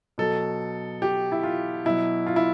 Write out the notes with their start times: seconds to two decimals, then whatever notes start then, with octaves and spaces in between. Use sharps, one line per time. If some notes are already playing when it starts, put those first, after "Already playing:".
0.18 B2 F#3 A4
1.02 G4
1.32 E4
1.43 F4
1.85 B2 F#3 E4
2.26 F4
2.36 E4